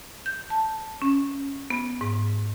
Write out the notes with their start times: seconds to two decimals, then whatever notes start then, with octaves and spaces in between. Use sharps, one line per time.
0.26 G6
0.50 A5
1.02 C#4
1.70 B3
2.01 G#2